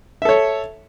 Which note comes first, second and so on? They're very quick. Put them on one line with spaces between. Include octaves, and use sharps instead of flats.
E5 A4 C#5